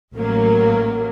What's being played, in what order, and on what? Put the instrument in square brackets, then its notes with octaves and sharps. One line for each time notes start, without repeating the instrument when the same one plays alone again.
[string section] A1 A2 F#3 A#3